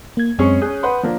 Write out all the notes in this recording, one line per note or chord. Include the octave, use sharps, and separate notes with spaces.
A#3 G#6
F#2 G#3 C4 C#4 G#4 C#6
C#4 G#4 D#6 F#6 G6
B4 F#5 C6
F3 A#3 D4